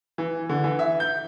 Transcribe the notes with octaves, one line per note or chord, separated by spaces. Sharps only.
E3
D3
E3
E5
G6